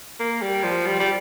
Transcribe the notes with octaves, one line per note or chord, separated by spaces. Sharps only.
A#3
G3
F3
G3
G3